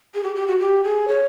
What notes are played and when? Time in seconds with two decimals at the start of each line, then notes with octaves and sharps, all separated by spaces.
0.15 G#4
0.24 G4
0.35 G4
0.48 F#4
0.60 G4
0.84 G#4
1.08 C#5